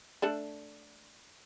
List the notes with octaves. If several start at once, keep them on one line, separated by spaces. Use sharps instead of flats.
A3 D4 A4